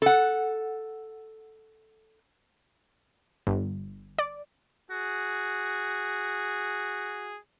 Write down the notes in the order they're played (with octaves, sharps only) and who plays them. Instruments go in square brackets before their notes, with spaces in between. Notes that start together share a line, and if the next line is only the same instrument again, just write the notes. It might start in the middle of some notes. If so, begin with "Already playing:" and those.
[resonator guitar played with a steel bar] A4 F#5
[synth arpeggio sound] G1
D5
[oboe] F#4 [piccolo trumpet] G#4